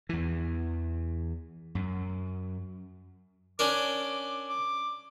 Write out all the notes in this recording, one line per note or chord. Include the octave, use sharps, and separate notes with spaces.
E2 E3
F#2
C#4 D4 A#4 D6
D6